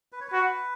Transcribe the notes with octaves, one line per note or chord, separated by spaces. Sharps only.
B4
C#5
F#4 B4